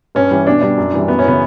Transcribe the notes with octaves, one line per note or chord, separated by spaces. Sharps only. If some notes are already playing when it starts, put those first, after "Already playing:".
G2 C#4
E3 G3
B2 D4
G3 D4
F#2
E3 G3
F#2 B3
C#4
C#3 E3 B3